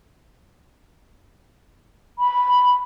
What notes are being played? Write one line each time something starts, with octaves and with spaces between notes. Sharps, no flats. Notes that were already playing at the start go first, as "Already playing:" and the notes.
B5